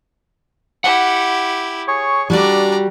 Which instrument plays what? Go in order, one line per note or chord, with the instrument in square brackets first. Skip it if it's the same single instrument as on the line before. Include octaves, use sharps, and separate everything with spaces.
[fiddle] E4 G4 [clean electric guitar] F#5
[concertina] G#4 C#5 C#6
[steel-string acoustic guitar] G3 F#4 G4 [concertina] D4 [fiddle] D5 A#5